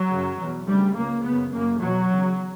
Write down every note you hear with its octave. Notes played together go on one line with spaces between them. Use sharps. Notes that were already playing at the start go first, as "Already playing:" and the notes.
Already playing: F#3
F#2 C#3
E2 B2
D2 C#3 G3
C#2 C#3 A#3
C#3 B3
F#2
F#2 C#3 A#3
E2 B2 F#3
E2 C#3